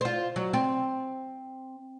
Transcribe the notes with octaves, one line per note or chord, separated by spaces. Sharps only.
F4 C5
F#3
C4